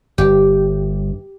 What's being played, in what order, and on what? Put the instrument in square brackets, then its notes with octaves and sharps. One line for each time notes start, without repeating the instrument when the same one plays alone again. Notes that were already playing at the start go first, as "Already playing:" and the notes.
[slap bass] G1 G2 [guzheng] G4